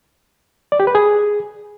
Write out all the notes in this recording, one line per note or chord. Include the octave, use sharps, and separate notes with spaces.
D5
G4
B4
G#4